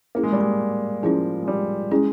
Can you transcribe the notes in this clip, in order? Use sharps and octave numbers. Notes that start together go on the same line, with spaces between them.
A#3 C#4 E4 G#4
G#3
G3
G#3
F3 C#4 E4 G#4
G#3
G3
G#3 C#4 E4 G#4